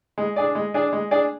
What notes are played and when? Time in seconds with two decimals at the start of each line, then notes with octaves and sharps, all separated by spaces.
0.18 G#3
0.36 D4 G#4 D5
0.55 G#3
0.74 D4 G#4 D5
0.93 G#3
1.11 D4 G#4 D5